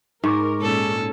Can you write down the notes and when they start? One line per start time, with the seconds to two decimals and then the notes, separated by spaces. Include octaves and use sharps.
0.24 G#2 D#4 A#4 C#6 D6
0.60 A#2 G#3 C#4 A4